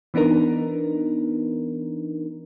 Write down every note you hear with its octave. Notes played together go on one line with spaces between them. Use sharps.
E3 B3 D4 D#4 A#4